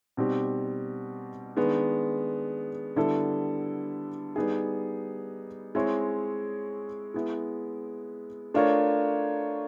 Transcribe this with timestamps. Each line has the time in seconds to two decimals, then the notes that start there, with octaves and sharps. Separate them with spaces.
0.17 B2 G3 C4 D#4 G4
1.57 D#3 G#3 B3 D4
2.96 D3 G3 B3 E4 A4
4.36 G3 B3 D#4 G#4
5.75 G#3 C4 E4 G#4 C#5
7.14 G#3 B3 E4
8.54 A3 D4 F4 A#4 C#5